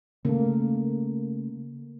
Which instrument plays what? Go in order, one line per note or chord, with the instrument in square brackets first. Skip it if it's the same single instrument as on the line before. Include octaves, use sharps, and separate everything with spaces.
[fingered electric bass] C#3 A3 [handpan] A#3